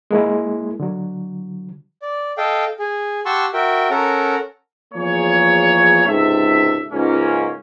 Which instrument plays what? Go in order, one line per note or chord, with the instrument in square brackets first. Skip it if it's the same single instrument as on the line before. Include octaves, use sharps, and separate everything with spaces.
[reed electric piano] G#3 A#3 E4
D3 F#3
[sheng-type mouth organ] D5
A4 D#5 F5 G5
G#4
G4 F#5 A5 C6 C#6 E6
F#4 A#4 E5 G5
C#4 A4 A#4 F#5 A#5
[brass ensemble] E2 F3 A#3 G#4 C#5
C#2 G#2 C3 A4 E5
C#2 G#2 A#3 C#4